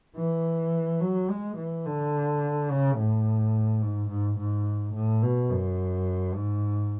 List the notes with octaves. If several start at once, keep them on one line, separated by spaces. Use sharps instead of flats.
E3
F#3
G#3
E3
D3
C#3
A2
G#2
G#2
G#2
A2
B2
F#2
G#2